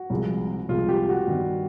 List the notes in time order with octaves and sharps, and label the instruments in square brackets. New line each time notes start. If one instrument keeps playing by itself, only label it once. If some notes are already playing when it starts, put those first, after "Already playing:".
Already playing: [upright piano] F#4
[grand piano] C2 C3 F3 G#3
[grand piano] C2 C3 F3 G#3 [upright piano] F4
[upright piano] G4
F#4
[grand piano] G2 D#3 G3 B3